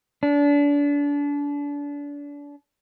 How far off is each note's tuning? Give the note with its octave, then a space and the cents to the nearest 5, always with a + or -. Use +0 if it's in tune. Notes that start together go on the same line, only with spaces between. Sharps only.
D4 -30